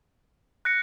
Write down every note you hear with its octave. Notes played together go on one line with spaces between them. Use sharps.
F#6 A#6 C#7